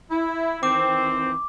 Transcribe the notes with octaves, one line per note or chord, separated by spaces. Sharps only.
E4
D#3 E3 C4 D6